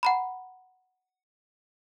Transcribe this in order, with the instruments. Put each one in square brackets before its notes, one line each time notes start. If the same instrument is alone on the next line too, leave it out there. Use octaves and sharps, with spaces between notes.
[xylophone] F#5 A#5 B5